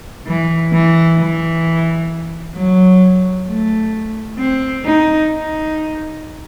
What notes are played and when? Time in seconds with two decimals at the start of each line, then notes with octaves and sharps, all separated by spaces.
0.27 E3
0.73 E3
1.19 E3
2.55 F#3
3.48 A3
4.39 C4
4.85 D#4
5.31 D#4